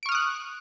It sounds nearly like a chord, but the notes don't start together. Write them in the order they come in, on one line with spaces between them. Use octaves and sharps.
D7 C#6 F6 D#6 F#6